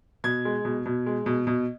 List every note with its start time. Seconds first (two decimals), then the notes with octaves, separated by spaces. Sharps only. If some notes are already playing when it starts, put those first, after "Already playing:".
0.24 B2 G#6
0.45 G#3
0.65 B2
0.86 B2
1.06 G#3
1.26 B2
1.47 B2